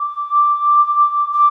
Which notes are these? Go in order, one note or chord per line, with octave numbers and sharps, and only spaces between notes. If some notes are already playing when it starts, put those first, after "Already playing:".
Already playing: D6
D6